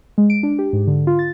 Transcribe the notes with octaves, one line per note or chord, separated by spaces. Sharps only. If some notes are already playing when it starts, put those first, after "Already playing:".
G#3
D7
D4
G4
G#2
D3
F4
A6